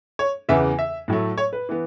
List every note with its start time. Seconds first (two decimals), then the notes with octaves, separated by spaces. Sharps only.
0.19 C#5
0.49 E2 C#3 E3 B3 E5
0.79 E5
1.08 A2 F#3 A3
1.38 C#5
1.53 B4
1.69 E3 B3